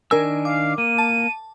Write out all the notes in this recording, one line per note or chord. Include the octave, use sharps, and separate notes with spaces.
D#3 D4 A#4 G#5 E6
F5 D6
A#3 D#7
A5